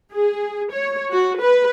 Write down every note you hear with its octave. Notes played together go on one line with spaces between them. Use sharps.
G#4
C#5
F#4
B4